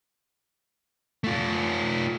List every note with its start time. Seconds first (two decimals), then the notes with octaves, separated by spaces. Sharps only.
1.24 A3 F4